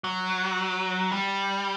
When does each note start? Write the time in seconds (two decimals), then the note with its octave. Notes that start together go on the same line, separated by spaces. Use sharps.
0.04 F#3
1.11 G3